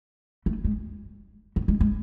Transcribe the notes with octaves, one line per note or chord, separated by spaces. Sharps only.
A3
G#3
A3
G#3
G#3